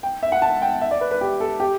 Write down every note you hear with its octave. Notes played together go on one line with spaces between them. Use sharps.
G5
E5
F#5
A5
G5
E5
D5
B4
B4
G4
A4
G4